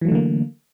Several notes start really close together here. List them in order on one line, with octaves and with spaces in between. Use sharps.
E3 F#3 A3 D3 A#3